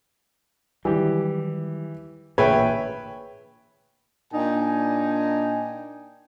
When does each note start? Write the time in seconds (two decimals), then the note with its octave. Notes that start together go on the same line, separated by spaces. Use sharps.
0.85 D#3 E3 F#3 G3 G4
2.38 A1 A#2 D3 G#4 B4 C#5 E5 G5
4.32 A#2 D4 D#4 G5 G#5